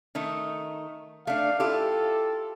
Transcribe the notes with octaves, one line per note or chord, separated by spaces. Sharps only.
D#3 A3 D#4
A3 D4 F5
E4 F4 G4 A4